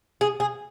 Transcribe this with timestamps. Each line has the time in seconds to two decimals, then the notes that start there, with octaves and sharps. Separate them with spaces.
0.21 G#4
0.40 G#4